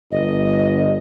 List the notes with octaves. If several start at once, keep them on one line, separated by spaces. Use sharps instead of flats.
G1 D#5